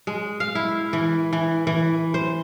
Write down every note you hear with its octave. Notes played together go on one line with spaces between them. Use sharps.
G#3
F5
E4
E3
E3
E3
C5